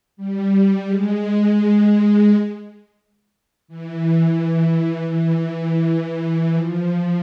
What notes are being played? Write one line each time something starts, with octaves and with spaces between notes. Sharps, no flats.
G3
G#3
E3
E3
F3